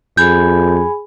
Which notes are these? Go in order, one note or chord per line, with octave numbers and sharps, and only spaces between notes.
F2 G#4 G#5 B5 G6